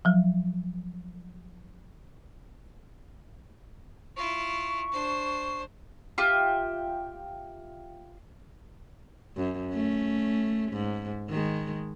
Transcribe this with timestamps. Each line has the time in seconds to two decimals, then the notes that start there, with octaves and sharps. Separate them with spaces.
0.05 F3 F#3
4.16 E4 F4 C#6
4.93 D4 C5
6.18 F4 G4 E5
9.37 F#2
9.72 A3 C#4
10.72 G#2
11.29 D#3 G#3